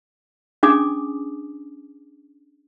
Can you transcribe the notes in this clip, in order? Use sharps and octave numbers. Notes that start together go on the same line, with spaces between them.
C#4 D4 G#4 G#5 D6 D#6